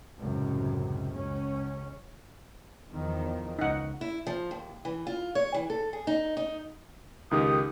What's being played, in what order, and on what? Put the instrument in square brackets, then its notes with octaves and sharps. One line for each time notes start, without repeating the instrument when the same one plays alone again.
[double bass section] C#2 F#2 A2 C3
C#2 C#4
E2 D#3 F3
[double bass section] C#2 [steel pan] D#4 F#5
[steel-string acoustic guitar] E4
F3
D#2
E3
F4
C#5
E3
A4
G#4
D#4
D#4
[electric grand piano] C#2 D#3 G4 [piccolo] D#6